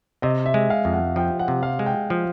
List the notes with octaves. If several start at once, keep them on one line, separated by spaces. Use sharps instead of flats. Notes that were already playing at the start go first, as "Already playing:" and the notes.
C3 D#5
E5
G#3
F5
F2
F#5
F3 G5
F#5
C3
F5
G#3
G5
F3